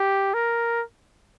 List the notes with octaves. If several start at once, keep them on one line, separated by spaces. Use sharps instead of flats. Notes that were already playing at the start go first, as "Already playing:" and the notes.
Already playing: G4
A#4